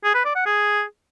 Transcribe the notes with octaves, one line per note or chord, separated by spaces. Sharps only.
G#4
B4
D5
F#5
G#4